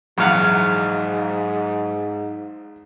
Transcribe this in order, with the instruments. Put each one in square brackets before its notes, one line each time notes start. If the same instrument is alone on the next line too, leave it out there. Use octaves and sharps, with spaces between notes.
[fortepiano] A#1 E2 F#5 [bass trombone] G#2 [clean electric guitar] F#3 F5